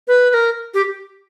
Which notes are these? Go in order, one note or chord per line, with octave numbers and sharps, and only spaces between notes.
B4
B4
A#4
G4